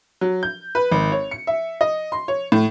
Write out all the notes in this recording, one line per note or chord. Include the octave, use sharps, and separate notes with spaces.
F#3
G6
B4
G#1
C#5
C#7
E5
D#5
C6
C#5
A2